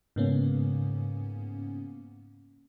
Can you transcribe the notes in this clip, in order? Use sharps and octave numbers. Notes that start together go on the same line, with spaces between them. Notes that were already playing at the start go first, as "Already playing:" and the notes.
G#2 C#3 A#3 B3 C#4